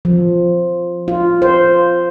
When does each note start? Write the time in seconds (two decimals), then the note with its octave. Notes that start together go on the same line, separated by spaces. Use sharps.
0.05 F3
1.08 F4
1.42 C5